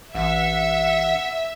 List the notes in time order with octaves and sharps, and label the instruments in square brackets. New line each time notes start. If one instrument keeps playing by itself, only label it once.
[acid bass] A1 [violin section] E5 [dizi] F#5